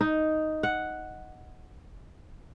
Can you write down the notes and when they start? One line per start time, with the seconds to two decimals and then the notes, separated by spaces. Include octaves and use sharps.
0.01 D#4
0.63 F#5